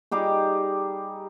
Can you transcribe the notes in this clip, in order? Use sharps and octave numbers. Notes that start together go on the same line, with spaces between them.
G3 D#4 G4 G#4